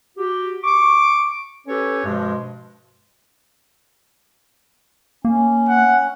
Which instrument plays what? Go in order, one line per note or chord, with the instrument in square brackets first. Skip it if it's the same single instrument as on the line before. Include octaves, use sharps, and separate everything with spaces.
[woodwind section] F#4 G4
C#6 D6
C#4 G4 A4 B4 C#5
G2 B2 F3 G#3
[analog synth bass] A#3 [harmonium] C#4
[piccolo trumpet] F#5